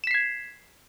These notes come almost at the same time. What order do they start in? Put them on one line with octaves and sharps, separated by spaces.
E7 B6 C7 G#6